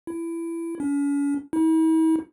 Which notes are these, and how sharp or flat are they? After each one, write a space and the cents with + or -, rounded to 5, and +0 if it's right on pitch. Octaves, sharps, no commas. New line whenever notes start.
E4 +20
C#4 +40
E4 -45